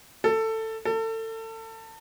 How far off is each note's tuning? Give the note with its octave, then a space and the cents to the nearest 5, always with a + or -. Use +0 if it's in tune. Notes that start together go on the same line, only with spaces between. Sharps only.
A4 +15
A4 +30